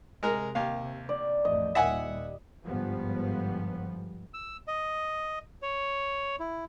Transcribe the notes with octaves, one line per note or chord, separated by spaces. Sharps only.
C3 G#3 A#4
D#2 F5
D5
A1 F2 A3 D#5
D#2 A#2 G3 E5 F#5 G#5
G1 G#2 F3 G3 B3
E6
D#5
C#5
E4